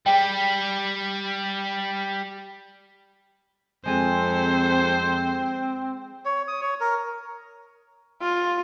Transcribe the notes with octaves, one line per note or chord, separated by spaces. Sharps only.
G3 G#4 G5
F2 G#3 C4 G#4 C5
C#5
D#6
C#5
A#4
F4